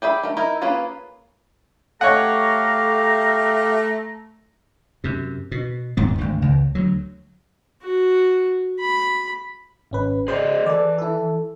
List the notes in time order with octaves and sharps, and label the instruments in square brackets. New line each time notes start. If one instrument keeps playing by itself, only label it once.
[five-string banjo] G4 G#4 E5 B5
A3 A#4
D#4 E4 A#4
A#3 C#4 F4 G#4 B4
[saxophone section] A3 [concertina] G4 F5 [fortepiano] C#5 F#5 [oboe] A#5
[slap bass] F#2 C3
B2
D#1 G#2 B3
G#1 D2
C#2
D2 F#3
[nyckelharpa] F#4
B5
[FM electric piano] G#1 C#4 B4
[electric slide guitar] G#4 D5 D#5 [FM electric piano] C5
[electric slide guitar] E3 [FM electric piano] A4 D5
[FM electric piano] E4 A4